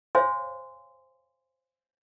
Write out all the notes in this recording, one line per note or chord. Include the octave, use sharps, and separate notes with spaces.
C5 C#5 F5 G#5 C6